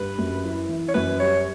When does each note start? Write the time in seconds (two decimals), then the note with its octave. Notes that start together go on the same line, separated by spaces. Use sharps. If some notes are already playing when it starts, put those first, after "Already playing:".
Already playing: G2 B4
0.18 F#2
0.44 E4
0.69 E3
0.89 C#5
0.94 F#2 B4
1.19 G3 C#5